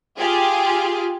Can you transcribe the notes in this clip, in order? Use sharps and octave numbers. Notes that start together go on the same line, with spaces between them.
F4 G4 G#4